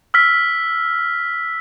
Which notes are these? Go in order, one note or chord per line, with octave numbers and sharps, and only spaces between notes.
E6 F6 B6